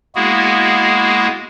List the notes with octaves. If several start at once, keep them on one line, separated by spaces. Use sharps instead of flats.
G#3 A#3 B3 E4 F#4 G#4